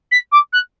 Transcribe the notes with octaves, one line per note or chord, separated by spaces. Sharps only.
B6
D6
F#6